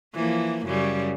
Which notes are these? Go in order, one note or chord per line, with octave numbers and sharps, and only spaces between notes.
E3 F3 A#3
F#2 C#3 G3